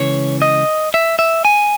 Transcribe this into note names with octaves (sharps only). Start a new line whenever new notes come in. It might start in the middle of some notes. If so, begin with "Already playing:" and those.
Already playing: C#2 C#3 E3 C#5
D#5
E5
E5
G#5